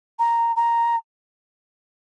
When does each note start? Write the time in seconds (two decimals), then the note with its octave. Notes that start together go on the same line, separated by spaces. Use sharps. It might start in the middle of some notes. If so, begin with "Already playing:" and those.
0.19 A#5
0.56 A#5